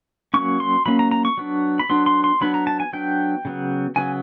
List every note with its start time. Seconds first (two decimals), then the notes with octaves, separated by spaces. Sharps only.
0.34 F#3 A#3 C#4 C#6
0.60 C6
0.86 F#3 A#3 C#4 B5
0.99 A#5
1.11 A#5
1.25 C#6
1.37 F#3 B3 D4
1.80 B5
1.89 F#3 B3 D4 C6
2.06 C6
2.24 C6
2.41 F#3 B3 D4 B5
2.54 A#5
2.67 A5
2.80 G#5
2.93 F#3 B3 D4 G5
3.45 C#3 F#3 B3
3.96 C#3 F#3 B3 G#5